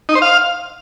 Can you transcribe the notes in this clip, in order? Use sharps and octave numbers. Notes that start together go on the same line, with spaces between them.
D#4
C5
F5